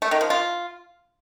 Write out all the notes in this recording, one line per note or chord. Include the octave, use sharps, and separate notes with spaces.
A3
D#3
F3
F4